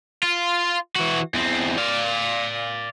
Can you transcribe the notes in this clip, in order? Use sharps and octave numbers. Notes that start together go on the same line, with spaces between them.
F4
E3 F#4
E2 C4
D5 F5